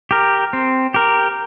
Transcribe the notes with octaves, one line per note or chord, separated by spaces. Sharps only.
G4 A#4
C4
G4 A#4